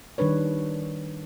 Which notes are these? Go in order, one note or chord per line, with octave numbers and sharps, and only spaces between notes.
D#3 G3 D4 B4 C#5